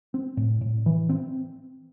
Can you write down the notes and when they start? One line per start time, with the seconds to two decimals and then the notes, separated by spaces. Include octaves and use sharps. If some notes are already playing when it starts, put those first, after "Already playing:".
0.14 C4
0.37 A2
0.61 A2
0.86 E3
1.09 C4